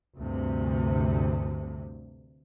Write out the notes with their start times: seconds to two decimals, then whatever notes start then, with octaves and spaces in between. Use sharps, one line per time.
0.16 D2 G2 C3